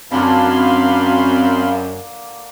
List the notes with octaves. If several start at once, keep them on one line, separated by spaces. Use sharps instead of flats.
F#2 D3 A#3 C4 F5 B5 C6